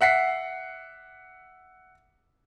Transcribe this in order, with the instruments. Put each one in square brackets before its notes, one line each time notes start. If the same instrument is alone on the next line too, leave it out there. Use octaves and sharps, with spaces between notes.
[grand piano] E5 F#5 B6 C7